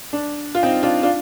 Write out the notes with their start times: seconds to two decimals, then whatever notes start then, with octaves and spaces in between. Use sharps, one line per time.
0.13 D4
0.55 F4
0.63 C4 D#4
0.83 D4 F4
1.03 D4 F4